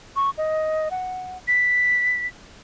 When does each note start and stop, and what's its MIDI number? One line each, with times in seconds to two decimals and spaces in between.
0.16 0.30 85
0.38 0.89 75
0.91 1.38 78
1.48 2.27 95